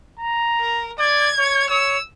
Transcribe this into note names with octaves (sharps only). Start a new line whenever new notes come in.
A#5
A#4
D5 G#6
C#5
C#5 E6